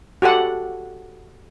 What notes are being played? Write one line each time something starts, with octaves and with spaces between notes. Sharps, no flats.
F#4 G4 A4 F#5